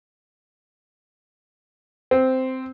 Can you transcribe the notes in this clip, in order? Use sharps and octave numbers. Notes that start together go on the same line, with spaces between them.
C4